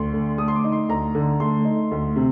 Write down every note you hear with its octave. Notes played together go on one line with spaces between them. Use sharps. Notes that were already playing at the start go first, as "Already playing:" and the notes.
Already playing: D2 C6
D3
A3 D#6
C6
D6
D#4
C6
D2 A#5
D3
A3 C6
D#4
D2
C3